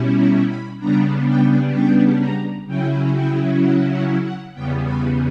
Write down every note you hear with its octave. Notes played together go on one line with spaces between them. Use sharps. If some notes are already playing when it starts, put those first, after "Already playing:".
Already playing: B2 G3 C#4 E4
A#5
B5
C#3 G3 B3 D4 A#5
G5
G5
A#5
C#3 F#3 C#4 E4 G5
G5
F#5
F#5
F#5
E2 C#3 G3 B3 G5
B5